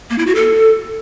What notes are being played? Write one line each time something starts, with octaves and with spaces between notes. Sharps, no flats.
A#3
E4
F#4
A4